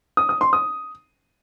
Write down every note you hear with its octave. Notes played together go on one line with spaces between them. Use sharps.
D#6
D#6
C6
D#6